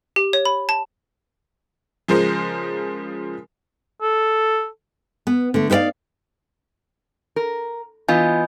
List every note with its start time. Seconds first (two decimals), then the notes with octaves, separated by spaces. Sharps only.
0.16 G4
0.33 C#5
0.45 B5
0.69 A5
2.08 C#3 F3 G#3 A#4 C5
4.02 A4
5.27 B3
5.54 D3 A3
5.70 D#4 B4 C5 D5 F5
7.36 A#4
8.09 E3 B3 F4 D#5 G#5 G6